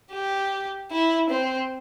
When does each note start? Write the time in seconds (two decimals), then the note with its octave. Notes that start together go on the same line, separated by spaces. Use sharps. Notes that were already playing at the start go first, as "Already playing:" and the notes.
0.12 G4
0.91 E4
1.30 C4